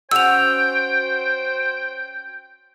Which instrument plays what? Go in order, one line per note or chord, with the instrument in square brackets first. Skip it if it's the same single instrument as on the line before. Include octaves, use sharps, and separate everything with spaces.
[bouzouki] C#4 F#4 F#5 [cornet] C5 [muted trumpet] G5 [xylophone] E6 F7